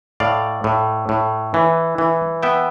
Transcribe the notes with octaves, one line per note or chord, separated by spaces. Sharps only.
A2 D5 F5
A2
A2
E3
E3
B3 E5 G5